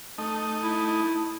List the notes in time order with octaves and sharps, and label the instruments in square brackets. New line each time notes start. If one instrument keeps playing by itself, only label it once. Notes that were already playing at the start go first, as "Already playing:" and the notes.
[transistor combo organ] A3 D#4
[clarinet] E4